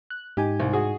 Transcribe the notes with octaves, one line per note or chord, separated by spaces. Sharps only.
F#6
G#2 D#4 G4 G#5
C2
F#4 G#4